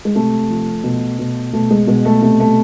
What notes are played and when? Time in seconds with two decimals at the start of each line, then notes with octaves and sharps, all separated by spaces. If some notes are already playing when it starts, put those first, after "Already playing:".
0.05 G#3
0.15 C3 A3
0.50 F3
0.84 B2
1.19 B2
1.53 B2 A3
1.71 G#3
1.87 B2 G#3
2.05 A3
2.22 C3 A3
2.40 A3